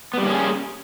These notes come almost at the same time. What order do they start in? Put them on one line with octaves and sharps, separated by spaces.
B3 G3 A#3 C#4 G#4